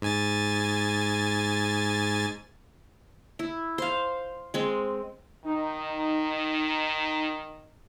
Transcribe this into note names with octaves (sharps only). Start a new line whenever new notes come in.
G#2 G#5 A6
E4
C5 F5
G#3 C4
D#3 D#4